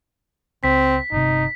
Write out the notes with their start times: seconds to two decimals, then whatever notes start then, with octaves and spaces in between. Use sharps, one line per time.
0.64 C#2 C4 B6
1.12 G1 C3 D#4